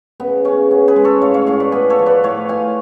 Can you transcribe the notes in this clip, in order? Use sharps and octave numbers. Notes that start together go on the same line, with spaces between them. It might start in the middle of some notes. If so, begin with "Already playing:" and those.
C#3 B3
C#3 C#4
B3
G#4 B4
G#3
A4 C#5
A2 C#5 F5
C#5 F5
A2 C#5 F5
B4 D5
B3 G#4 B4
A4 C#5
F3
B4 D5
A2 C#5 F5
A2 F5 G#5